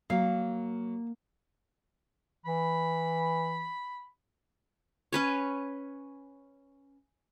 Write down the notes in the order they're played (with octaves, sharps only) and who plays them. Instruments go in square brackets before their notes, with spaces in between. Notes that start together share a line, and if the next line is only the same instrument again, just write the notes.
[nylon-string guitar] F#3 [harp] A#3 [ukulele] F5
[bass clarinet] E3 [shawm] B5
[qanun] C#4 B4 C#5